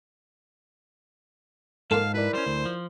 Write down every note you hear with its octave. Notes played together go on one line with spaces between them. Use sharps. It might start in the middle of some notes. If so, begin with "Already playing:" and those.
G#2 A#3 F4 A4 F5 A5
E4 A#4 B4 D5
G3 C#4 C5
D2
F3